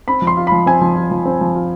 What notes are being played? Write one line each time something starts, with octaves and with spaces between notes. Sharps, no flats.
C4 B5
F3
C6
F4
F3 B5
C4 G#5
F3
F4
F3
C4
F3
F4